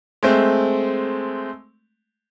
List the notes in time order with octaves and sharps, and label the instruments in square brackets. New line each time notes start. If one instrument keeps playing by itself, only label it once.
[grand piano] G#3 A3 C4